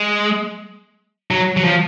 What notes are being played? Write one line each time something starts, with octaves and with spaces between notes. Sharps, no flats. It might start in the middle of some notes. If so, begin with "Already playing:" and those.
Already playing: G#3
F#3
F#3
F3